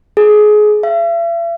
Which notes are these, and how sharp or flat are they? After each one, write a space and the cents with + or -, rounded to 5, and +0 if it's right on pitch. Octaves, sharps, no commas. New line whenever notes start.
G#4 +25
E5 +45